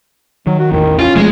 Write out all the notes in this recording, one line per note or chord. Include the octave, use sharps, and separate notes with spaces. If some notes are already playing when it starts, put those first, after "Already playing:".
D#3 F#3
F#4
A1 E2 D#3
C#4 F4
E1 F3 G#3 A3